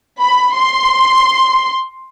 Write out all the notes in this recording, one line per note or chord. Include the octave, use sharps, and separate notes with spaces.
B5
C6